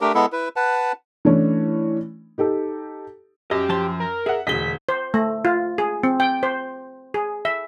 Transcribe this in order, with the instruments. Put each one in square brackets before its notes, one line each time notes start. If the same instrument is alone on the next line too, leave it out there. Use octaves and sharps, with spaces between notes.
[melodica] A3 D4 G4 A#4
G#3 B3 E4 A4
E4 B4
B4 F#5 A5
[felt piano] E3 A3 C#4 D4
D#4 G4 A4
[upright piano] F#2 [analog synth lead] G4 [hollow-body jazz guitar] D#5
[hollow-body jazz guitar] F3 A5 C6
[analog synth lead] A#4
[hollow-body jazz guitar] G#4 [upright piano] E5 F#5
[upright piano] E1 G7 [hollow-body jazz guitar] D2 G#4 D#5 [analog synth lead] B6
[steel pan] C5
A3
F4
G#4
C4
G5
C5
G#4
E5